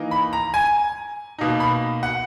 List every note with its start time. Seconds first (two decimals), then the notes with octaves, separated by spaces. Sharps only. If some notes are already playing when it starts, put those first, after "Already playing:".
Already playing: E3 A#3 D#4
0.11 B5
0.33 A#5
0.54 G#5
1.38 B2 A#3 D#4
1.60 B5
2.03 F#5